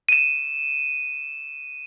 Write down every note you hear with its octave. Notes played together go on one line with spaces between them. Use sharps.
D#7 E7